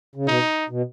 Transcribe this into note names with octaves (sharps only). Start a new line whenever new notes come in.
C#3
B2 D#4
B2